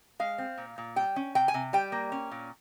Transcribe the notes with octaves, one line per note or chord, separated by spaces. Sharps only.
G#3 F5
C4
A#2
A#2
G3 G5
C#4
C3 G5
G#5
C3
G3 G5
A#3
C#4
A#2